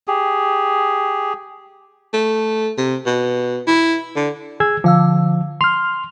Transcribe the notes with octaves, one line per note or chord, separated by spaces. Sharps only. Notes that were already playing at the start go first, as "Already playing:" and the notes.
G4 G#4
A3
C3
B2
E4
D3
G#4 E6 G#6
D3 F3 F5 E6
C6 F6 F7